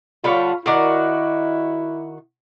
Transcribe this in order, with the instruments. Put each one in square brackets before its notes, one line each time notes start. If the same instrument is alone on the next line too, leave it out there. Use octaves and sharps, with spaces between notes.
[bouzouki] D3 G3 F#5 [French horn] F4 [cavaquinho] C#5 F5 B5
[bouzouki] D#3 F#4 [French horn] E4 [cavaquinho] A#4 D5 F#5